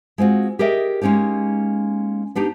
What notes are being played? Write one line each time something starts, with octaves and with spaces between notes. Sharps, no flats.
G#3 C4 F4 F#4
G4 G#4 A#4 D#5 E5 G5
G#3 A#3 C#4 D#4 G4
B3 D4 D#4 G4